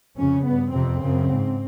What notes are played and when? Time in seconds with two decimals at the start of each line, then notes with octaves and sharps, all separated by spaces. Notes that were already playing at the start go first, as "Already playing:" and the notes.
0.16 F2 C#3 C#4
0.45 G2 B3
0.73 F2 C3 C4
1.02 F#2 C#3
1.30 G#2